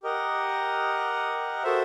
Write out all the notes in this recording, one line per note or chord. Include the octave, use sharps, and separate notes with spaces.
G4 A#4 D#5 F#5
F#4 A4 C5 E5